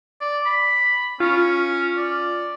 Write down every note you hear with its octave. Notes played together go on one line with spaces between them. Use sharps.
D5
B5
C#4 F4
D5